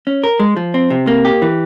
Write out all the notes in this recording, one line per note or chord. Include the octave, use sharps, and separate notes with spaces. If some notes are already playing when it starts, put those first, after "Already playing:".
C#4
A#4
G#3
F3
C4
C3
A#3
G4
E3